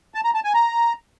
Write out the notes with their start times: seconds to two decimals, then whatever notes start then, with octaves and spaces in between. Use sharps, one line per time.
0.14 A5
0.24 A#5
0.34 A5
0.44 G#5
0.54 A#5